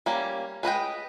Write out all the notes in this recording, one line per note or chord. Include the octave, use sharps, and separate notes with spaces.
G3 A#3 C#4
G#3 B4 D#5 G5